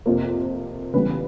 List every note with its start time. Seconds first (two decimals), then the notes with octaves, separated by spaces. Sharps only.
0.06 F2 C3 F3 A#3
0.93 C#3 E3 G3 B3 B4